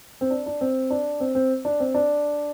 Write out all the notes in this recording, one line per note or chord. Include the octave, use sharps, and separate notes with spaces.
C4
D4
D4
C4
D4
C4
C4
D4
C4
D4